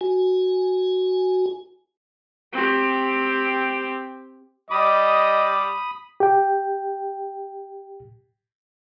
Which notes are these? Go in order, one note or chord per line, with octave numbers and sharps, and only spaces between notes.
F#4 G#5
C4 G4
G3 D#5 B5 D6 D#6
G4 G5